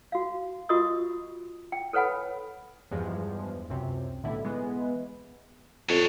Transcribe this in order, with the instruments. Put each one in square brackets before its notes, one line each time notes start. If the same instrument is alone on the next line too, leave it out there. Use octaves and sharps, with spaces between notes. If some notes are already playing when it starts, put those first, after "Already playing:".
[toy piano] F#4 F5
F4 F#4 A#4 D#5 C#6 D#6
G5
A4 B4 C#5 F#5 G#5 B5
[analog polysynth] E2 G2 F3 G#3
C#2 F#2 C3
B1 A2 D3 E4
E3 G#3 B3
[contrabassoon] F2 [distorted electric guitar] D4 C#5